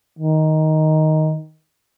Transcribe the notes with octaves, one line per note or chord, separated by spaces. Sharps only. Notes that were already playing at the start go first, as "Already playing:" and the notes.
D#3